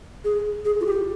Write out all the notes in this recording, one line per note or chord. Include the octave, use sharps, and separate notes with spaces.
G#4
G#4
F4
G4